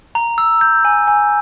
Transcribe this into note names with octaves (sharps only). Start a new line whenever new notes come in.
A#5
E6
G6
G#5
G#5